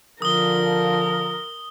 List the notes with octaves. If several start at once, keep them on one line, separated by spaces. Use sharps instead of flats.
D3 F3 A#4 D#6 G7